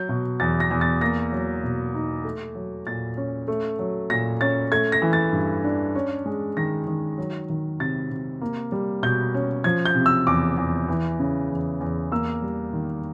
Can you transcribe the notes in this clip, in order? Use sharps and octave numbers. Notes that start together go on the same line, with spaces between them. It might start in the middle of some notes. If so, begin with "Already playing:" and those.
Already playing: F#3 G6
B2
E2 A6
A#6
E2
A6
A#3 A#6
F#3
B2
D#4
A3
F#3
A#2 A6
C#4
A3
F#3
A#2 A#6
C#4 A6
A3 G#6
A#6
E3
A6
G2
D4
C#4
G#3
D#3 A#6
D#3
F#3
D#3
C3 A6
C3
A#3
G3
B2 G6
C#4
F3 G#6
G6
C3
E6
E2 D6
E2
E3
C#3
E2
E2
A#3 E6
G3
D#3